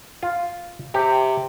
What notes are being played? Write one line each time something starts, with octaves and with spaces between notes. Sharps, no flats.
F4
C3 G4